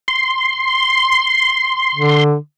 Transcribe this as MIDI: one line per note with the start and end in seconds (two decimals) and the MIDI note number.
0.08 2.24 84
1.95 2.35 50